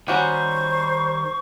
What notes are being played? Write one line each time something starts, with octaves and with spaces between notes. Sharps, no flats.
D#3 G3 C#4 F#4 G4 C5 C#6